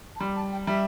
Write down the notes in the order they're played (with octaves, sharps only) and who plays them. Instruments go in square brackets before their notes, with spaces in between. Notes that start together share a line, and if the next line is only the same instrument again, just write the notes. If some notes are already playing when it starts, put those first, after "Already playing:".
[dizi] A5
[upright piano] G3 [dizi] C6
[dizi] A5
G5
[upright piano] G3 [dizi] E5